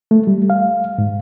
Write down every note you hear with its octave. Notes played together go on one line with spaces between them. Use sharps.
A3
G3
F5
G#2